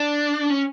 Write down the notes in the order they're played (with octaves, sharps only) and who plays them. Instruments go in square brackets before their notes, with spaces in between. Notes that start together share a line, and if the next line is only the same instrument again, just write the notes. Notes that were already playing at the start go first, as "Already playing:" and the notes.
Already playing: [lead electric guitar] D4
C#4